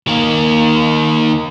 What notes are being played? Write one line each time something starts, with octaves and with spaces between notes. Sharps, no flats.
D#3 A#3